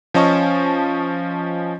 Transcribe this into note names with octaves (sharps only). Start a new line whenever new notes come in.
F3 C#4 D#5 A5 C#6